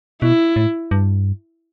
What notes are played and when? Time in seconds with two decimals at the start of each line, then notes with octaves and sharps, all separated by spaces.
0.22 B2 E4
0.56 A2
0.91 G2